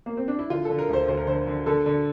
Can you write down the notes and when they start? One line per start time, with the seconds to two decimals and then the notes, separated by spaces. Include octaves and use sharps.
0.06 A#3
0.17 C4
0.28 D4
0.39 E4
0.50 D3 F4
0.65 D3 A4
0.79 A#4
0.89 D2 C5
1.08 D2 C5
1.17 A#4
1.27 D3 C5
1.47 D3
1.66 D3 A4
1.86 D3